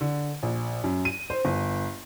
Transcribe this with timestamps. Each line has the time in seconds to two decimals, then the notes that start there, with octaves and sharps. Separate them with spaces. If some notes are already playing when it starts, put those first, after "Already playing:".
0.01 D3
0.43 A#1
0.84 F#2
1.05 D#7
1.30 C5
1.45 G1